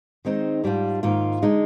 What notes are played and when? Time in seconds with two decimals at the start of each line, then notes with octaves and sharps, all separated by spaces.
0.25 D#3 G#3 C4 D#4
0.64 G#2 G3 D4 F4
1.03 G#2 D#3 A#3 F4
1.42 D3 G#3 D#4